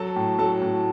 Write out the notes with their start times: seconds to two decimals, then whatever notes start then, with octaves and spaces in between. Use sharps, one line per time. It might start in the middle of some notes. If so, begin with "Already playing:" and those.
Already playing: F#3 A4 A5
0.16 A2
0.39 F#3 A4 A5
0.61 A2